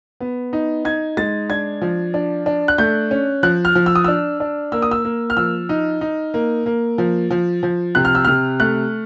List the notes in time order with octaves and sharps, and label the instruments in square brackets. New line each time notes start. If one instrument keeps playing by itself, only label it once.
[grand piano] B3
D#4
D#4 G#6
G#3 A6
D4 G#6
F3
D4
D4
F#6
A3 G6
C#4
F3 F#6
F6
F3
E6
D#6
D4 E6
D4
A#3 E6
D#6
E6
A#3
F6
F3 E6
D#4
D#4
A#3
A#3
F3
F3
F3
C3 F#6
F6
E6
C3 F6
A3 F#6